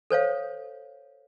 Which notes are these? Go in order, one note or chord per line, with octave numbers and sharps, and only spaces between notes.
A4 C5 C#5 F5